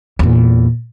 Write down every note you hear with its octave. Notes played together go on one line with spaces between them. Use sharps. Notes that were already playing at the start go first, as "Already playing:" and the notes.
E2 A#2